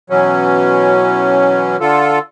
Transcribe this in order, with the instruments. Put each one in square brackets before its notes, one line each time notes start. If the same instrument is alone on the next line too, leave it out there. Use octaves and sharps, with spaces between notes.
[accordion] B2 E3 F#3 C#4
D3 F4 A4